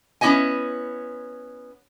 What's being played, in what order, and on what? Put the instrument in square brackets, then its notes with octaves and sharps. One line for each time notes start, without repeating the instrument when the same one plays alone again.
[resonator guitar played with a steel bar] B3 C#4 E4 G4 D#5 G#5